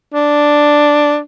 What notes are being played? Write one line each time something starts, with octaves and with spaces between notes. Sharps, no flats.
D4